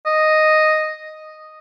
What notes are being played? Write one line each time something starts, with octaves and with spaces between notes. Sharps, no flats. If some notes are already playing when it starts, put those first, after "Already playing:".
D#5